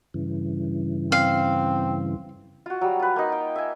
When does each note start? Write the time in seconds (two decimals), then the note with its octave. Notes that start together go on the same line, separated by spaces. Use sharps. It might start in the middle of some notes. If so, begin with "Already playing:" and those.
0.14 G2 C#3 E3
1.12 C4 F5
2.66 F4 F#4
2.81 F#3 G3
2.99 F4 B4
3.16 A#3 D#4
3.32 G5
3.56 E5 G#5